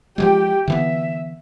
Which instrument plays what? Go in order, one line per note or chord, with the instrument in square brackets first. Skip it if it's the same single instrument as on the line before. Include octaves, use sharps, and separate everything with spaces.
[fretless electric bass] F3 F#3 G#3 [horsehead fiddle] G4 G5
[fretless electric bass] D3 E3 B3 [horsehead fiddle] E5